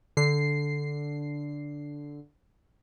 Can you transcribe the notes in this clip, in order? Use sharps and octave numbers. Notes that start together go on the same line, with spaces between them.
D3 C7